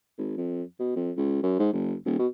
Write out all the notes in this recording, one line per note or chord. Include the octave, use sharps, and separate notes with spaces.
G#1
F2
B2
F2
C#2
F#2
G#2
F#1
D#1
B2